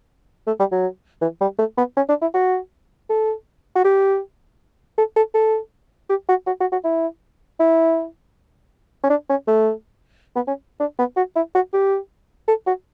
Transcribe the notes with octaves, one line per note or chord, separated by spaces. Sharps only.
A3
G3
F#3
E3
G3
A3
B3
C#4
D4
E4
F#4
A4
F#4
G4
A4
A4
A4
G4
F#4
F#4
F#4
F#4
E4
E4
C#4
D4
C#4
A3
B3
C#4
D4
B3
F#4
E4
F#4
G4
A4
F#4